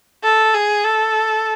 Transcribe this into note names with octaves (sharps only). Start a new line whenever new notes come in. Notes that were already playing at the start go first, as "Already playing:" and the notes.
A4
G#4
A4